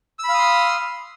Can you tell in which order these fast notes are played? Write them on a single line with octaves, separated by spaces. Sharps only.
E6 B5 F5 D#6 C6